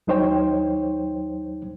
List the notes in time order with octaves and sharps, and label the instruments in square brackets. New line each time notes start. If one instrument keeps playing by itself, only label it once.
[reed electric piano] D#2 F#3 D#4 C5 C#5 G5